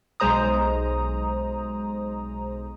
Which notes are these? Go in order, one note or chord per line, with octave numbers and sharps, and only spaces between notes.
B1 G#3 C5 A#5 D#6